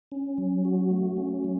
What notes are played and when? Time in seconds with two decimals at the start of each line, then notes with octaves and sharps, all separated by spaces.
0.12 C#4
0.38 F#3
0.65 F#4
0.91 A3
1.17 C#4
1.44 F#3